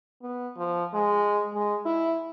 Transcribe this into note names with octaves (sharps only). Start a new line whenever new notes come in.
B3
F3
G#3
G#3
E4